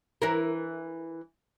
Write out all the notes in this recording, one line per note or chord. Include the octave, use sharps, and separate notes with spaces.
E3 E4 A#4